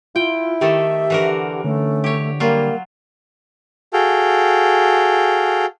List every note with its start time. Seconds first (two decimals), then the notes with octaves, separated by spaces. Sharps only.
0.16 E4 F4 G5
0.61 D#3 A3 G4 A4 E5
1.10 D3 E3 F#4 A#4
1.64 D3 A3 C#4
2.04 G4 C#5
2.40 F#3 G3 A#3 F4
3.93 F#4 G#4 A4 F5 G5